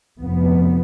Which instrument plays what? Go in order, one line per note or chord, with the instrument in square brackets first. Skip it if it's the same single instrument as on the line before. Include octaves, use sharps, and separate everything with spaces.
[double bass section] F1 F2 F3 B3